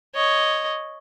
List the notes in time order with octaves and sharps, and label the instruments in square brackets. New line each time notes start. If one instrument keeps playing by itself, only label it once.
[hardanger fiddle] C#5 D#5